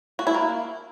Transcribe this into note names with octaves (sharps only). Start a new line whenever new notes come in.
F#4
E4
A#3